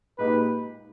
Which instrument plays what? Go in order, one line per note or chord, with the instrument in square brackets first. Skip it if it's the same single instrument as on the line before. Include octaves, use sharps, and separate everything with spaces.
[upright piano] A#2 G#3 D#4 G4 [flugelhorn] B4